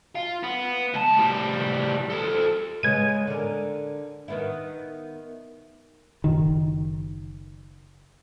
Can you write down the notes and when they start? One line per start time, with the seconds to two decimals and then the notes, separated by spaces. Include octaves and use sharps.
0.15 F4
0.43 B3
0.94 C#2 A5
1.18 A2 G3
2.10 A4 C5
2.83 C#3 G#3 B3 G#6 D#7
3.27 D3 A#4
4.28 D#3 B3 E4
6.24 F#1 D#3